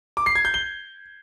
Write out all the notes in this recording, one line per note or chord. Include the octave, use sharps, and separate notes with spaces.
D6
C7
G#6
G6
G7